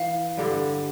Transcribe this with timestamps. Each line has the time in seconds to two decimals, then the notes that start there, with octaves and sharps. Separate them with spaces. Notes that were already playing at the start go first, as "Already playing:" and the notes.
Already playing: E3 F5
0.37 G2 D3 G3